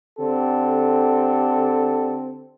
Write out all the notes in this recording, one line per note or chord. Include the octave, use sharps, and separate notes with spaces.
D3 C4 G4 A4